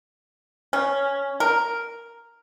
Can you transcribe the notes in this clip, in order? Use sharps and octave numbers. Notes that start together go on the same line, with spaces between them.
C#4
A#4